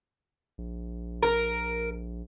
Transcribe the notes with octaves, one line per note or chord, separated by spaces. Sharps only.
A#1
A#4